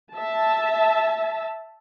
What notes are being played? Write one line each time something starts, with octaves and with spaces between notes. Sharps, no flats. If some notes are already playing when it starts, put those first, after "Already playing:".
E5 A5